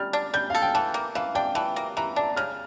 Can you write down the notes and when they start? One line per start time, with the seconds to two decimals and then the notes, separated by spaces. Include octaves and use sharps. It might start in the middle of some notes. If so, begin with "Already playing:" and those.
Already playing: G3 F6
0.13 D4
0.34 G3 G6
0.50 A4 F5
0.62 G5
0.74 E3 A5
0.94 A#3
1.15 E3 F5
1.35 D4 G5
1.55 E3 A5
1.76 A#3
1.97 E3 A#5
2.16 D4 A5
2.36 C#3 F6